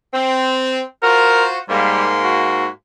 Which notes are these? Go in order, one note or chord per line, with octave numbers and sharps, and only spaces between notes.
C4
F4 F#4 A#4 C5
G#2 G3 A#3 C6
F#4